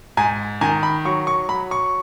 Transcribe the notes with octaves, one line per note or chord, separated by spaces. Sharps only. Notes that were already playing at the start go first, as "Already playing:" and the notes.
G#2 G#5
D#3 G#5
B5
F#3 C#6
C#6
F#3 B5
C#6